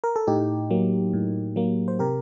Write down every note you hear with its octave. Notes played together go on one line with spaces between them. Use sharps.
A#4
A4
A2 D#4 G4
F#3 A#3
A2
F#3 A#3
C5
C3 G4 A#4